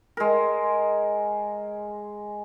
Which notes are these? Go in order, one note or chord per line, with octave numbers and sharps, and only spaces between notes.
G#3 A#4